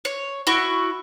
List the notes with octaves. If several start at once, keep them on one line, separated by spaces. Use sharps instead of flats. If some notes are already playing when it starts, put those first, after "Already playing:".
C#5
E4 F#4 C#6